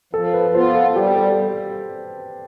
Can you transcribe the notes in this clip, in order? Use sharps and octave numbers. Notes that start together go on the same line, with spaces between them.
F3 A4
B4
B3 F4 C5
A4
G3 G4
A4